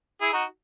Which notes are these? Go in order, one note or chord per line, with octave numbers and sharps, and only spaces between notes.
E4 G#4
D#4 F#4